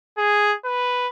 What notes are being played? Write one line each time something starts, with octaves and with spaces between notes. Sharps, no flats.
G#4
B4